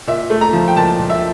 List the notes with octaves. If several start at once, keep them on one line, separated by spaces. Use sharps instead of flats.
A#2 E5
A3
A#5
F3
G5
A#2 A5
A#2
E5